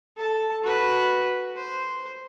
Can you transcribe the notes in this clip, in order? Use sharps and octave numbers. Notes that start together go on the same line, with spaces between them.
A4 A5
F#4 B4
C5